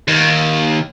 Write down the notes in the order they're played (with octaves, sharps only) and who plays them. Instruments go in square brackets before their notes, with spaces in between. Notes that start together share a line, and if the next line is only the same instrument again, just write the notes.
[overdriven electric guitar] D#2 D#3